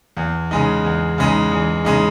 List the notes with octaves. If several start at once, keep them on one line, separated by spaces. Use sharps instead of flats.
E2
C#3 G#3 D#4
E2
C#3 G#3 D#4
E2
C#3 G#3 D#4